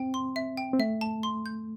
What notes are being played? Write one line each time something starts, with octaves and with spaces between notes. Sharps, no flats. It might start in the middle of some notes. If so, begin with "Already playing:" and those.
Already playing: C4 G5
C6
E5
G5
C4
A3 E5
A5
C6
G6